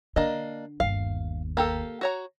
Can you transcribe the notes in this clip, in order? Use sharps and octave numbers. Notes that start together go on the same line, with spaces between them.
D3 A#3 D4 D#5
G1 D#2 F5
A#3 G4 A4
F#4 C#5 A#5